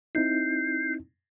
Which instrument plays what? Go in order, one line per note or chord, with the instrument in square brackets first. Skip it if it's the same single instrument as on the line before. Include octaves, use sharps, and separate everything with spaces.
[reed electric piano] C4 D#4 E4 [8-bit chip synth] G6 C7